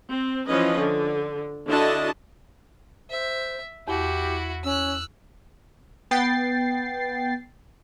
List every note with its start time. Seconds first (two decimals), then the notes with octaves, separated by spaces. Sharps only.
0.10 C4
0.47 E3 F3 C#4 B4 D#5
0.78 D3
1.68 D3 D4 E4 F#4 D#5 A5
3.10 C5 E5
3.88 E2 E4 F#4 G4
4.64 C#4 E6 F#6
6.11 B3 G5 A6 C7